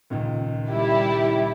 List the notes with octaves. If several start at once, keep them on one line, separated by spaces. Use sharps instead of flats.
C#2 A#2 D#3
G3 E4 G4